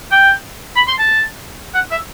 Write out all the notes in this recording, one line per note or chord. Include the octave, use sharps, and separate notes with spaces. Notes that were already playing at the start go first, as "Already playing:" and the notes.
G5
B5
C6
A5
F#5
E5